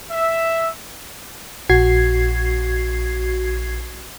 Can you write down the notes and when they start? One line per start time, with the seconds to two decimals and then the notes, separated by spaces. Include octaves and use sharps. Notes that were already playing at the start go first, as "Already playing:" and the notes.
0.11 E5
1.69 A#1 F#4 G#6 C7